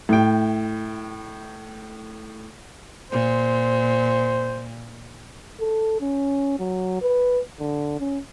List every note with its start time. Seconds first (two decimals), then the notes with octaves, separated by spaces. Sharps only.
0.09 A2 G5
3.12 A#2 C5
5.60 A4
6.01 C#4
6.59 F#3
7.01 B4
7.59 D3
8.00 C#4